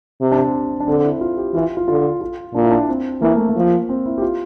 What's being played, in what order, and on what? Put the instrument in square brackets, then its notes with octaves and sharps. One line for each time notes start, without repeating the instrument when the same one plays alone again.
[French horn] C3
[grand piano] D4
C4
D4
[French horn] D3 [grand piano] C4
[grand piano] E4
F4
G4
[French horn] E3 [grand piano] F4
[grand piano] F4
[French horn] D3 [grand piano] F4
[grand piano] F4
[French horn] A#2 [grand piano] D4
[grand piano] E4
D4
C4
[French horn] E3 [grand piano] A#3
[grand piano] A3
A#3
[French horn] F3
[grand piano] C4
E4
G4
F4